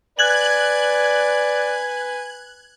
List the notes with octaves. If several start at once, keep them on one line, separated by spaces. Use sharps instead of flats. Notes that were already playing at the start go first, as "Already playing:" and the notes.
B4 D5 G#5 F#6 G#6 F#7